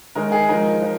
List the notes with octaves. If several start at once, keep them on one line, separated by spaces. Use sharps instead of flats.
D#3 G#3 D#4 A#4
G#4
F3 G#3 D#4 A#4
F3